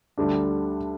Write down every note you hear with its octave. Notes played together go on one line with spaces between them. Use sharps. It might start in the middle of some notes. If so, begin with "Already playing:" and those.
D2 D3 G3 D4